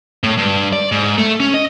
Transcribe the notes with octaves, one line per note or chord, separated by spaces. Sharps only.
A2
G2
D5
G#2
A3
C#4
D#5